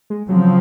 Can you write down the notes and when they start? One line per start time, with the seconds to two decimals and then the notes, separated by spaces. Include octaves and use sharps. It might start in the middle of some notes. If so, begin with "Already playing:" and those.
0.10 G#3
0.28 C#3 F3 F#3 C4